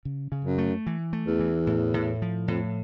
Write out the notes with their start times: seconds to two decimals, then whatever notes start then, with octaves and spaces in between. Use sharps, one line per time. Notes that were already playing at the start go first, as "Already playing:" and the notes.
0.05 C#3
0.32 C#3
0.45 F#2
0.58 A3
0.87 E3
1.13 A3
1.27 E2
1.40 E3
1.67 A2
1.94 A2
2.22 F3
2.48 F2 A2